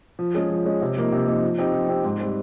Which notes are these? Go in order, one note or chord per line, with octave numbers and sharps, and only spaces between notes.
F3
G#3 C#4 G#4
F3
G#3 C#4 G#4
C3
F3 A#3 D#4
C3
F3 A#3 D#4
F3
C4 D#4 G4
F3
C4 D#4 G4
G#2
G3 C4